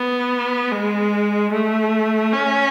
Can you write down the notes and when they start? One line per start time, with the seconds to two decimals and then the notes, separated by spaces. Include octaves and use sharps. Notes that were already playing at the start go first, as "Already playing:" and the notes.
Already playing: B3
0.71 G#3
1.52 A3
2.33 C#4